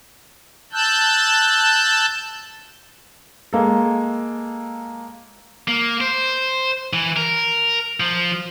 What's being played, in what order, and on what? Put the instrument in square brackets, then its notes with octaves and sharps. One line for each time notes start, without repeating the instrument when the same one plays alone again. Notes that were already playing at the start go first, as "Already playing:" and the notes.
[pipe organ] A5 E6 F#6 G6
[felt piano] G#3 A#3 A4
[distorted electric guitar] A#3
C5
E3
A#4
F3